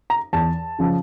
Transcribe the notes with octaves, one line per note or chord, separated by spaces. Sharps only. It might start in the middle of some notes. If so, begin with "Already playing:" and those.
A#5
E2 A5
C#3 F3